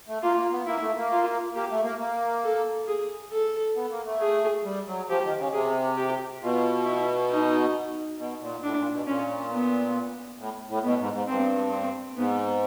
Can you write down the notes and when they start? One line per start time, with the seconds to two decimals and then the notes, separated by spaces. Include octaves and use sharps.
0.08 A3
0.22 A#3 F4
0.37 A#3
0.53 B3
0.66 A#3 E4
0.81 A3
0.97 A#3
1.12 F4
1.55 A#3 G4
1.71 A3
1.84 A#3
2.00 A#3
2.44 A4
2.88 G#4
3.32 A4
3.76 B3
3.91 A#3
4.06 A3
4.21 G#4
4.64 G3
4.87 F#3
5.09 F3 G4
5.23 D#3
5.38 C#3
5.53 C3 G#4
5.97 G4
6.42 B2 F4
6.85 E4
7.31 D#4
8.19 B2
8.41 A#2
8.63 A2 D4
8.78 A#2
8.92 B2
9.07 A#2 C#4
9.52 B3
10.39 A2
10.69 A2
10.84 B2 B3
10.99 G#2
11.13 G#2
11.27 G2 C4
11.72 C4
12.16 G#2 B3